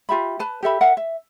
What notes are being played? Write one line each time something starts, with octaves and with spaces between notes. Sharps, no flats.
F4 G4 E5 B5
B4 A5
G4 A4 E5 B5
A#4 E5 F#5
E5